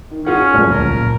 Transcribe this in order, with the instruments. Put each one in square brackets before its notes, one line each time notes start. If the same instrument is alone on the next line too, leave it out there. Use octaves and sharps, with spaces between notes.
[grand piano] D#3
[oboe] C#4 [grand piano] F4 G#4 F#5
[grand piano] F#1 F3 F6 [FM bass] A2
[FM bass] C#2 [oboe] A#4
[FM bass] A#2